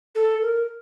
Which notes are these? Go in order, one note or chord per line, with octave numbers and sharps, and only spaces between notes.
A4
A#4